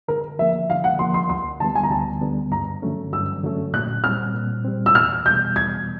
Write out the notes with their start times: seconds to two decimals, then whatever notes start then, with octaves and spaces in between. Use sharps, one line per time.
0.08 D3 A#4
0.39 F3 A#3 E5
0.69 D3 F5
0.84 F#5
0.99 F3 A#3 C6
1.14 C6
1.29 D2 C6
1.60 D3 G3 B3 A5
1.75 G#5
1.83 A#5
1.91 D2 A5
2.21 D3 G3 B3
2.51 G2 A#5
2.82 D3 F#3 A3 C#4
3.13 G2 E6
3.43 D3 F#3 A3 C#4
3.73 A#2 F#6
4.04 G3 C4 F6
4.34 A#2
4.65 G3 C4
4.86 E6
4.95 E2 F6
5.25 B2 G3 B3 G6
5.56 E2 G#6